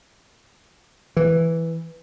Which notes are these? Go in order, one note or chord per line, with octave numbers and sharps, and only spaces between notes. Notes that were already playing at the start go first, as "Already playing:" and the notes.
E3